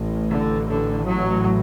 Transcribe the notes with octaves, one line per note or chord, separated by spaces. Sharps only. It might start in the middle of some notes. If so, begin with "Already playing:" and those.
Already playing: A1 A2
D3
D3
F#3